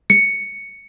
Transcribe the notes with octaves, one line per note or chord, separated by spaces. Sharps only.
C#7